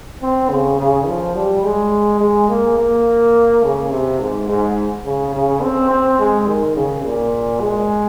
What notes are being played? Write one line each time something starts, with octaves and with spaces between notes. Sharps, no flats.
C4
C#3
C#3
F3
G3
G#3
G#3
A#3
A#3
C#3
C3
G#2
G#2
C#3
C#3
C4
C4
G#3
D#3
C#3
A#2
G#3